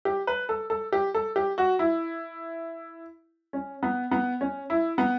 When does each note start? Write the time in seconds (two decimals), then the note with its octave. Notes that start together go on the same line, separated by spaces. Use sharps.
0.05 G4
0.27 B4
0.49 A4
0.70 A4
0.92 G4
1.14 A4
1.36 G4
1.58 F#4
1.79 E4
3.53 C#4
3.83 B3
4.11 B3
4.41 C#4
4.70 E4
4.98 B3